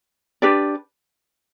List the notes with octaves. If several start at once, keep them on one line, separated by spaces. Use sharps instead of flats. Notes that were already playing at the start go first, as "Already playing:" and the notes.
D4 G4 B4 D5